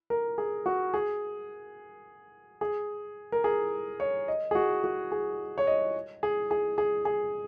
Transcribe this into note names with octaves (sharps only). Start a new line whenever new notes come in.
A#4
G#4
F#4
G#4
G#4
A#4
G#4
C#5
D#5
G#4
F#4
F#4
G#4
C#5
D#5
G#4
G#4
G#4
G#4